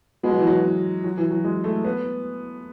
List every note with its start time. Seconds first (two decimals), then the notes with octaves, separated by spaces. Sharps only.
0.23 B2 G#3
0.31 F#3
0.39 E3
0.47 F#3
1.04 F#3
1.17 E3
1.31 F#3
1.44 G#3
1.64 A3
1.85 B3